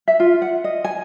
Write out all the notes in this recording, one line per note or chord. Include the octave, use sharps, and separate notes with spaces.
E5
F4
F#5
D#5
G#5